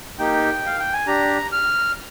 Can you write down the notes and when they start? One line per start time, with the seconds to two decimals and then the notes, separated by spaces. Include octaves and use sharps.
0.19 A#3 D#4 G4 G5
0.66 F5
0.80 G5
0.93 G#5
1.07 D4 G4 A#5
1.52 F6